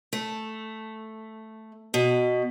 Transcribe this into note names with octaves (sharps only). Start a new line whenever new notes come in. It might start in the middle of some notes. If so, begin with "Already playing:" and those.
A3
B2